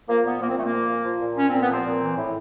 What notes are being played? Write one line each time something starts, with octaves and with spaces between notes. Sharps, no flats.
F3 A#3
A#2 B3
F3 A#3
C4
A#2 A3
A#3
F3
A#2
F3
A#2
F3 C#4
A#2 C4
B3
F3 C4
A#2
E3
A2